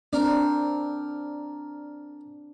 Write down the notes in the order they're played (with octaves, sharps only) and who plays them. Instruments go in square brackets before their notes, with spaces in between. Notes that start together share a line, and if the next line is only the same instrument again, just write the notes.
[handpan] C4 D4 [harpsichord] A#4 D5